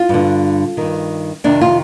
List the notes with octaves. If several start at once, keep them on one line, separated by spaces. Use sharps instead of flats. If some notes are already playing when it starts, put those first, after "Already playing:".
Already playing: F4
G2 D3
G2 D#3
F2 C3 D#3 D4
F4